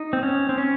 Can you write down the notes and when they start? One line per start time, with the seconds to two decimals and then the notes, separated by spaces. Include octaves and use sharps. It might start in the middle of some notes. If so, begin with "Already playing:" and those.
Already playing: D#4
0.13 C4
0.23 C#4
0.49 C4
0.58 C#4